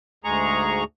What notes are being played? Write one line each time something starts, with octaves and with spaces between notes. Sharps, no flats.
D2 G#2 G#3 G#4 A#5 C#6